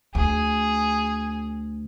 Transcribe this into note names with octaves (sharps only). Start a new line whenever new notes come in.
D2 G#4